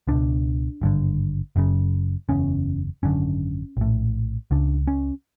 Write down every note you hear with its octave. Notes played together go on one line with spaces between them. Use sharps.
C#2 B2 D4
G#1 G2 D3
F#1 F#2 C#3
F#1 E2 C#3 C#4
G#1 F#2 D3 C#4
A#1 A2
C#2 C#3 D4
C#4